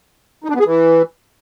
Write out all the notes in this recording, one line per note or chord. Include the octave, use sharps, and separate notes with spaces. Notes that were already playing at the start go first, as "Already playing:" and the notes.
D#4
D4
B3
G#4
E3